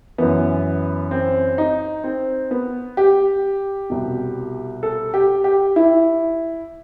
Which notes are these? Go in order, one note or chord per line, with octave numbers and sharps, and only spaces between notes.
F#2 E3 B3
C4
D#4
C4
B3
G4
C2 B2
A4
G4
G4
E4